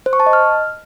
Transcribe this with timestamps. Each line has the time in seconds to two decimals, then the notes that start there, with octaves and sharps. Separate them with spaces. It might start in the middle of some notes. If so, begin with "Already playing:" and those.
0.06 C5
0.13 C#6
0.20 A5
0.26 D#5
0.33 F6